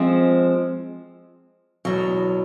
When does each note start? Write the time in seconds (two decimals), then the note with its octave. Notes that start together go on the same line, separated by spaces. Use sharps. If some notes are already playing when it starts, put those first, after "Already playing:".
Already playing: F3 G#3 C4
1.85 E2 B2 F#3